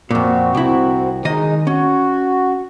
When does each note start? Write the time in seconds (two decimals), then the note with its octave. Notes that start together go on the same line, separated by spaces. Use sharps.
0.11 F2 A#2 C4 F#4
0.55 C2 E4
1.25 D#3 G#3 D#4 D#5
1.67 C#4 F#4